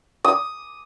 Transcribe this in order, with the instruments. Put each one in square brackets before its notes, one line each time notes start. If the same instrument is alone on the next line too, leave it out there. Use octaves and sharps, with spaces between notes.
[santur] D#6